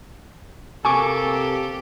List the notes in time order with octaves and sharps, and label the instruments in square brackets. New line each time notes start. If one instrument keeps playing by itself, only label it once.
[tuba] C3 [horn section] A#3 A4 [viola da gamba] G4 [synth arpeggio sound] G#5 C#6 D6